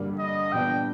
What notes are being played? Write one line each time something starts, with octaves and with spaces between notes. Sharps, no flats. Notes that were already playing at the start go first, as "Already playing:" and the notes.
Already playing: G2 D3 G3 A#3
D#5
A#2 G3 B3 D4 G5